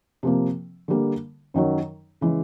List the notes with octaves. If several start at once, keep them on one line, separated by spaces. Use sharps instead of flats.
C3 F3 A#3
D3 G3 A#3
F#2 D#3 F#3
C#3 E3 G#3